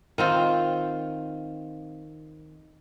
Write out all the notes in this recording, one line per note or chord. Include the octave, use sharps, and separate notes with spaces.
D#3 C4 F4